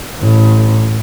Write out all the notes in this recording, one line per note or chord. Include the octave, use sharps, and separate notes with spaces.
A1